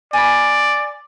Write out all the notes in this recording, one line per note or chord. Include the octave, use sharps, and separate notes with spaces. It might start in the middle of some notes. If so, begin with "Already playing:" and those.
D5 G#5 B5